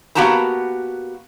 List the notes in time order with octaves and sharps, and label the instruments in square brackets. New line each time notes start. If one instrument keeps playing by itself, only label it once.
[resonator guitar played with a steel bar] A#3 B3 F#4 G4 A5 A#5